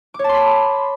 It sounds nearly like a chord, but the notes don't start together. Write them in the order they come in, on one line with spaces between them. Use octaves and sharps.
D6 C#5 A5 C6 B5